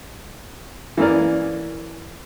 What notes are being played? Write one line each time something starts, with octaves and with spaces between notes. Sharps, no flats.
E3 A#3 C#4 A#4 D5